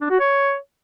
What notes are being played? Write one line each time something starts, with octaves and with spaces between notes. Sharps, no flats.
D4
F#4
C#5